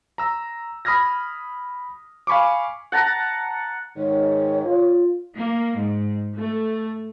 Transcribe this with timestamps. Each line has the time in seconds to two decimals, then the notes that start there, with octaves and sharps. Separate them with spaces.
0.18 A#5 E6
0.85 B5 D#6 F6 G#6 A#6
2.27 F5 G#5 B5 C#6 D6
2.92 F#5 A5 A#5
3.97 G#2 D#3 C#5
4.65 F4
5.37 A#3
5.76 G#2
6.36 A3